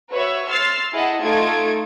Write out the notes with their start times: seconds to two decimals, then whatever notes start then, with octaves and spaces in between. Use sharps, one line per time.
0.11 F#4 B4 C#5 E5
0.47 C6 E6 F6 A6 C7
0.93 E4 G#4 D#5 F#5 A5
1.22 A3 D#4 F4 G#6 D7